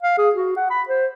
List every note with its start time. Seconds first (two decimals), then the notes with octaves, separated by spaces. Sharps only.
0.03 F5
0.18 G#4
0.35 F#4
0.56 F#5
0.70 B5
0.88 C5